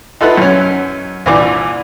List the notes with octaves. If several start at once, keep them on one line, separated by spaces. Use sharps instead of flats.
D#4 F4 A4 B4 E5 F#5
F#2 C#4
C2 A#2 E3 D4 D6